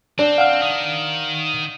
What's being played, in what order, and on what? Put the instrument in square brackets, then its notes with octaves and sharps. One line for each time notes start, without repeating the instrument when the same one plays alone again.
[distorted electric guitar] C4 [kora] D4
[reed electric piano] F5 F#5 F6
[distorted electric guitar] D#3